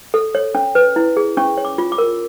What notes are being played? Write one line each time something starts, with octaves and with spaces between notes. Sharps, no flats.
A4
C#5
C#4
B4
E4
G#4
C#4 C#6
C#5
D6
F4
D6
A#4